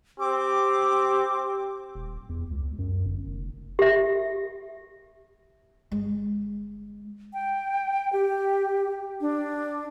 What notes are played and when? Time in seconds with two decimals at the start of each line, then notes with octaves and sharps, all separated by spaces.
0.20 C4 G4 D6
1.95 D#1
2.29 E2
2.51 C#2
2.79 F#2
3.06 G1
3.27 F1
3.79 G4 E5
5.91 G1 G#3
7.33 G5
8.13 G4
9.21 D4